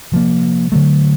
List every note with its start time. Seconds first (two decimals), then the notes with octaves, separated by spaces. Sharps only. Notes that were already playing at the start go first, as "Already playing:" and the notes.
0.12 C3 F3 A#3
0.72 D3 F#3 A3